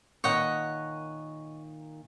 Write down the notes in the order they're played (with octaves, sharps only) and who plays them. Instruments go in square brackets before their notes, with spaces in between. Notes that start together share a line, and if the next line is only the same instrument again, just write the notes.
[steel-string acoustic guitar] A#2 D#3 [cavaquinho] C#5 D#5 F#5